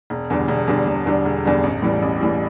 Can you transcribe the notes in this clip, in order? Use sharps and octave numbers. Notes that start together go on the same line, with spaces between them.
E1
E2 D3 G3
E1
E2 D3 G3
E1
E2 D3 G3
E1
E2 D3 G3
A1
A2 E3 G3
A1
A2 E3 G3